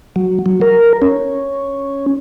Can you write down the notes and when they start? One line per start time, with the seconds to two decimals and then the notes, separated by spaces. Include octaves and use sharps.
0.16 F#3
0.46 F#3
0.61 A#4
1.02 C#4